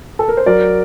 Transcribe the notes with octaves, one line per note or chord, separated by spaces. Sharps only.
A4
A#4
C5
F#3 A#4 D5